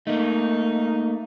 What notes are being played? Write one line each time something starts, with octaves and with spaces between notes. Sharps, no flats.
A3 A#3 D#4